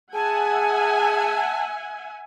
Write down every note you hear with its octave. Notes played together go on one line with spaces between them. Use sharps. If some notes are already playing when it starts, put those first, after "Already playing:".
G#4 E5 F#5 G#5 A5